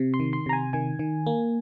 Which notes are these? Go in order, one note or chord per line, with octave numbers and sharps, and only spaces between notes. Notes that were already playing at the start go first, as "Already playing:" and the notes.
Already playing: C3
C6
D#3
C6
C3 A#5
G#5
D#3 G#5
D#3
A#3